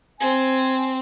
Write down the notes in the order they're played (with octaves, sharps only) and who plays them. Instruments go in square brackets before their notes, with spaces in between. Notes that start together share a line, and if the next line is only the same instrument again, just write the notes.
[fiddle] C4 [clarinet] G#5